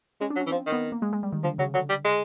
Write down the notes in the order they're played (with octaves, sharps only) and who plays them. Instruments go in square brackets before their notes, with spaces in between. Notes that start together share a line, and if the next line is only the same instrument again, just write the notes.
[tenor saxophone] G#3 [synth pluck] C#4
[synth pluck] D4
[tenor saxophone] F#3
[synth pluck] C#4
[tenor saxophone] E3
[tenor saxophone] F3 [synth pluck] C4
[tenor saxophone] D#3
[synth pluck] B3
A#3
G#3
G#3
G3
D#3
[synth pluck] D3 [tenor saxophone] F3
[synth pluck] C#3 [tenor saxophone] F#3
[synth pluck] D3 [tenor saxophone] F#3
[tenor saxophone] G3
G#3